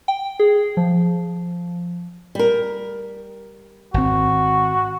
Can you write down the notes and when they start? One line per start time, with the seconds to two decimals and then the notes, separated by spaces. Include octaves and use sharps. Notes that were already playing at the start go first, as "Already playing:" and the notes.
0.08 G5
0.40 G#4
0.77 F3
2.35 G3 A#4
3.94 G#1 C4 F#4